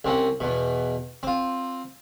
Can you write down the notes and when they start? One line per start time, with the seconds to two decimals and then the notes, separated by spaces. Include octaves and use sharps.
0.05 C2 C4 C#4 F#5
0.40 E2 B2
1.23 C4 F4